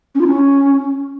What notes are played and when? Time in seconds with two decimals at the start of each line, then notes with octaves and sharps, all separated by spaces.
0.15 C#4
0.21 F4
0.27 C#4